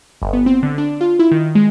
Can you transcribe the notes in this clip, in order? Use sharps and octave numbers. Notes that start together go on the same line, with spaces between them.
G1
B3
C4
D3
D4
F4
E4
D#3
G#3